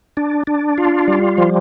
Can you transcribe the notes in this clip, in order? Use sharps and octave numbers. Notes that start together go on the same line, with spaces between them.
D4
D4
F4
G3
F3